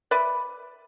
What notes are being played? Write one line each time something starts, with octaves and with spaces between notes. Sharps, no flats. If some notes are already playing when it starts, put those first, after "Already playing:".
B4 D5 E5 B5